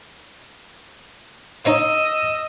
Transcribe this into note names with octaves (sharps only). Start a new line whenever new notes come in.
D#4 C#5 D#5 F5 E6